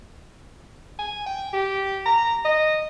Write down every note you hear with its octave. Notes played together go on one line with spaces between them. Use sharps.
G#5
G5
G4
A#5
D#5